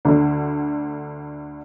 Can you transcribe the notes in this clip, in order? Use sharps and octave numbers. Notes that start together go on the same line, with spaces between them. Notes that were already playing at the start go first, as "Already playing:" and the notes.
D2 D3